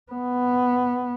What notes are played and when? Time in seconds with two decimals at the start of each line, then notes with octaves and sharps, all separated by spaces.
0.12 B3